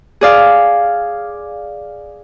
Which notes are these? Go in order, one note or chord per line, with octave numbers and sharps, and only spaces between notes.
G#4 D5 F5